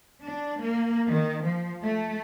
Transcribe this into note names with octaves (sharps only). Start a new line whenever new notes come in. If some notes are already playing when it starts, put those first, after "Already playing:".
D4
A#3
D#3
F3
A3